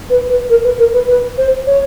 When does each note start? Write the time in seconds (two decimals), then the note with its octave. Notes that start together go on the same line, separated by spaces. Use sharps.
0.09 B4
0.29 B4
0.49 A#4
0.63 B4
0.78 A#4
0.93 B4
1.07 B4
1.37 C5
1.66 C#5